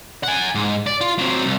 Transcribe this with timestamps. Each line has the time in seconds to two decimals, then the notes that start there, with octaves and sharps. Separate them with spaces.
0.23 F#5 G#5
0.55 G#2
0.87 D5
1.01 F4
1.19 F#3 C4
1.45 C2